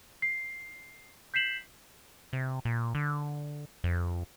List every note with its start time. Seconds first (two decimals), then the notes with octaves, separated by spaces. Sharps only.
0.22 C7
1.34 G6 B6 C7 E7 F#7
2.33 C3
2.65 A#2
2.95 D3
3.84 F2